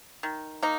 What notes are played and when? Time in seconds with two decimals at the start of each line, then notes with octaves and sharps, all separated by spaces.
0.23 D#3
0.62 A#3 D#4